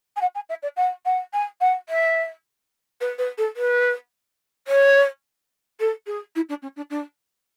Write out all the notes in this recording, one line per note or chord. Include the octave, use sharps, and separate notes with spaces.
G#5
F#5
G#5
E5
D5
F#5
F#5
G#5
F#5
E5
B4
B4
A4
B4
C#5
A4
G#4
E4
D4
C#4
D4
D4